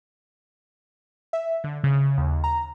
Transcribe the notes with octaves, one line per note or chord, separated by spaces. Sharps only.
E5
D3
C#3
D#2
A#5